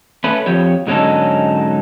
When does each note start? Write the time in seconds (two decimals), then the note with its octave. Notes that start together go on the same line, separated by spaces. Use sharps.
0.24 A3 C#4 B4
0.46 F2 F3 G4 C#5
0.87 G#2 D3 F#3 C#4 D#4 A4